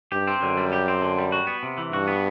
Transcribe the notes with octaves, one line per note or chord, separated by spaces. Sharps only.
G2 G4
C4
F#2 D3
G3
G4
C4
D3
G3
F#4
B3
C3
E3
G2 F#4
B3